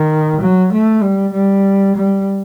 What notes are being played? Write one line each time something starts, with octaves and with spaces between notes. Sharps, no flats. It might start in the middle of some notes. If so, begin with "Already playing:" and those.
Already playing: D#3
F#3
A3
G3
G3
G3